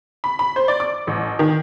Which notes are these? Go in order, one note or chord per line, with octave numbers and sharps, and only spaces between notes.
B5
B5
C5
D5
D6
A1
D#3